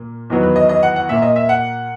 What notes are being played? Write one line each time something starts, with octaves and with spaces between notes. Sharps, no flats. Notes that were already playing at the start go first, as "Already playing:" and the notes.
Already playing: A#2 A#3
E2 D#3 F#3 B3
B4
D#5
D#5
F#5
F#5
A#2 A#3 E5
D#5
E5
F#5